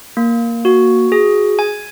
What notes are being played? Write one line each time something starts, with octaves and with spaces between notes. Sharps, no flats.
A#3
F#4
G#4
G#5